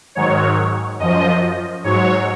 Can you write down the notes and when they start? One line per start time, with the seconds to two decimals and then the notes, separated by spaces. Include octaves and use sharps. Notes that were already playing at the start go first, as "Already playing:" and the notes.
0.15 G#2 D#3 F#3 C#5
1.00 F#2 F3 D#5
1.84 G#2 F#3 C#5